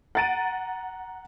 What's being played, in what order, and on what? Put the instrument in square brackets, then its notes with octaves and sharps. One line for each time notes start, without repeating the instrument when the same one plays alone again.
[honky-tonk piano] F#5 A#5 A6 D7 D#7